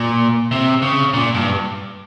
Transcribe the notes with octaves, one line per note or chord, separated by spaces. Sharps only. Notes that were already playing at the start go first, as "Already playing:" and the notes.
Already playing: A#2
C3
C#3
A#2
G2